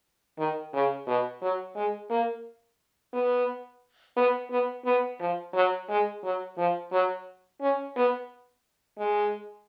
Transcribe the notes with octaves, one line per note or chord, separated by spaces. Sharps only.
D#3
C#3
B2
F#3
G#3
A#3
B3
B3
B3
B3
F3
F#3
G#3
F#3
F3
F#3
C#4
B3
G#3